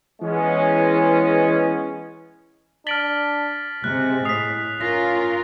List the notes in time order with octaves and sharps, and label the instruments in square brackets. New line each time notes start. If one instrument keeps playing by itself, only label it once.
[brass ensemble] E3 G#3 B3 C#4
[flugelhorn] D4 [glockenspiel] F6 D7 G7 [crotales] A6 B6 F#7
[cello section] C3 [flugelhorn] G#3 [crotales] F#6
[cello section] A2 [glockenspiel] D#6 B6 [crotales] C7 F7
[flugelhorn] C#4 [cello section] F4 A#4 [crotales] A#6